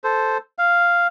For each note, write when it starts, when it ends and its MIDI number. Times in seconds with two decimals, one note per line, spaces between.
0.04 0.38 69
0.04 0.38 72
0.58 1.07 77